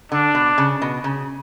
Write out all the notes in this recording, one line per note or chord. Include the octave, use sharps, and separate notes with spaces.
D3 D4
B2
C#3
B2
C#3